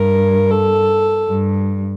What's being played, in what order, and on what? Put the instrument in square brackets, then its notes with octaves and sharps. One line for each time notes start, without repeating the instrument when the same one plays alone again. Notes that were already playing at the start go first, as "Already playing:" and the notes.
Already playing: [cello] G2 [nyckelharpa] A#4
[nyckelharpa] A4
[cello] G2